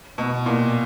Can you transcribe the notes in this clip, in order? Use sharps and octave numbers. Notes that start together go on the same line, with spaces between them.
B2
A#2